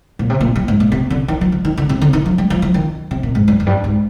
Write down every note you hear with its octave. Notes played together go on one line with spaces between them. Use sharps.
A#2
C3
A#2
G2
G#2
A#2
C3
D3
D#3
F3
F3
D#3
D3
C3
D3
D#3
F3
G3
F3
F3
D#3
C3
A#2
G#2
G2
F2
G2
G#2